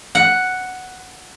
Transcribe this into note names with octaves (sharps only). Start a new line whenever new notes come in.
F#5